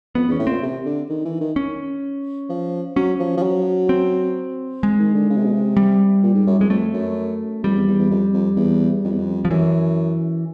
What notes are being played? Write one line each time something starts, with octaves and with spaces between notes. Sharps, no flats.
F2 B3
E2
C#4
A2
A#2 C4
C3
D3
D#3
E3
D#3
C#4
F3
F#3 C#4
F3
F3
F#3
C4
G#3
D#3
D3
C#3
C3
B2
C3
G3
A#2
G#2
F#2
F2 G#3
F2 A3
F#2
F2 G3
E2
E2
E2
F2
F2
E2
F2
E2
F2
F3
F#2 E3